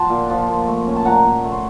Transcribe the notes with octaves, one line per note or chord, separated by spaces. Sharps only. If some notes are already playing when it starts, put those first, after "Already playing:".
Already playing: F3 F#5 A5 C6
A#2
F3
A#2
A3
C#4
A5
A#2 F#5 A#5
A#2
A3
C6